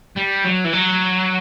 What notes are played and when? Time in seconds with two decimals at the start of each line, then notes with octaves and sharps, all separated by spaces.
0.16 G3
0.44 F#3
0.64 E3
0.73 F#3